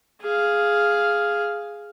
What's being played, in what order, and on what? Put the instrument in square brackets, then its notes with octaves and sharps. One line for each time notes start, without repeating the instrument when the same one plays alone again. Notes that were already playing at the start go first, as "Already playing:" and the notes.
[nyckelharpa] G#4 F5